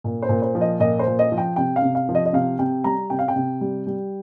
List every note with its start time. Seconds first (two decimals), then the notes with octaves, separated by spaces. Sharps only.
0.04 A#2
0.22 C5
0.29 A#2
0.42 C5
0.55 F3
0.61 D#5
0.80 A#2 D#5
0.99 C5
1.06 A#2
1.19 D#5
1.32 F3
1.38 G5
1.56 C3 G5
1.76 F5
1.82 C3
1.95 F5
2.09 F3
2.15 D#5
2.26 D#5
2.33 C3 F5
2.59 C3 G5
2.84 G3 A#5
3.10 C3 G5
3.19 F5
3.28 G5
3.36 C3
3.61 G3
3.87 G3